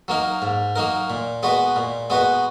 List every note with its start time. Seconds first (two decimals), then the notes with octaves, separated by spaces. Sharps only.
0.08 F#3 A#3 D#4 A#4
0.42 G#2
0.76 F#3 A#3 D#4 A#4
1.10 A#2
1.43 G#3 B3 F#4 B4
1.76 A#2
2.10 G#3 B3 F#4 B4